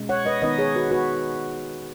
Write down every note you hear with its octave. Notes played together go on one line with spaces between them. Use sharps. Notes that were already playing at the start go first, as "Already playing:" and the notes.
Already playing: B2 G#3 C#4
C#5 F#5
B4 D#5
D#3 B3 D#4 B4 D#5
G#4 C#5
F#4 B4
F#4 B4